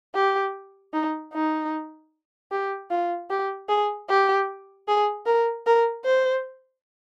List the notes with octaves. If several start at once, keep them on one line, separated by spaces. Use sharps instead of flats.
G4
D#4
D#4
G4
F4
G4
G#4
G4
G#4
A#4
A#4
C5